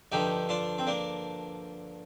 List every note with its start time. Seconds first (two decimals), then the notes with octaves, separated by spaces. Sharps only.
0.12 G2 D3 F3 D#4 G4
0.49 D4 F4
0.78 C4
0.87 A#3 D4